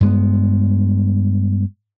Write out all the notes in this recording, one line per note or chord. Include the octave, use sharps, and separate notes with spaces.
G2 G#3 B3